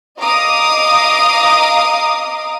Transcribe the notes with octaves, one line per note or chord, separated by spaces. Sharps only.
D#5 F5 A#5 D6 D#6